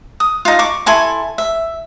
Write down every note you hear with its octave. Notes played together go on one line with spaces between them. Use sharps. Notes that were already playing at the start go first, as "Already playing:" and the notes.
D#6
D#4 F4
C#6 D6
E4 A4 G#5 C6
E5